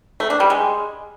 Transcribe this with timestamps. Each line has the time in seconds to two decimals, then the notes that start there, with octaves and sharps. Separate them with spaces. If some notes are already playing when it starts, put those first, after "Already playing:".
0.20 A3
0.30 D4
0.40 G3
0.50 G#3